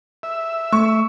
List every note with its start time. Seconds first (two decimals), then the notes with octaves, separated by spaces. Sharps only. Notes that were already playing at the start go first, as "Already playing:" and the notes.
0.23 E5
0.73 A3 C#6